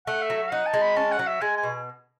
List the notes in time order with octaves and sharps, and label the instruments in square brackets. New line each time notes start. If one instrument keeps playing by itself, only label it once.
[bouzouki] A3 [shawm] F#5
[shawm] E5
[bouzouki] F#3
[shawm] E5
[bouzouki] D#4 [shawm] F#5
[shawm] A5
[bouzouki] G#3
[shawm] B5
[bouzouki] C#4 [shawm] A5
[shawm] F#5
[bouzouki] F#3
[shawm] E5
[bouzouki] G#3 [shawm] G#5
[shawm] G#5
[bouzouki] B2